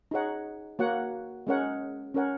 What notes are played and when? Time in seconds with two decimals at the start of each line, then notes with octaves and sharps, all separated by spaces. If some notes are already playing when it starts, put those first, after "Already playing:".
0.11 D#4 G#4 C#5 F#5
0.79 A#3 F#4 C#5 F#5
1.47 G#3 C#4 A#4 C#5 F#5
2.14 C#4 A#4 C#5 F#5